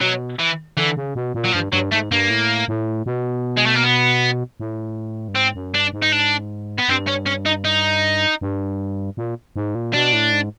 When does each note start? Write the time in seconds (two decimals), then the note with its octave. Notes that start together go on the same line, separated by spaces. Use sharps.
0.01 B2 F#3
0.39 E3
0.77 D3 E3
0.97 C#3
1.15 B2
1.34 A#2
1.45 F#3
1.53 G2 F3
1.73 G2 F#3
1.92 G#2 A3
2.11 G2 A#3
2.30 A2
2.68 A2
3.06 B2
3.57 G#3
3.66 A3
3.75 A#3
3.83 B3
4.60 A2
5.28 G2
5.35 G#2 C4
5.55 F#2
5.74 G2 D4
5.93 G#2
6.02 D#4
6.13 D4
6.78 B3
6.89 G2 C4
7.07 C#4
7.26 C#4
7.46 D#4
7.65 D#4
8.41 G2
9.17 A#2
9.56 G#2
9.75 A#2
9.93 B2 D4
10.13 A2
10.32 G#2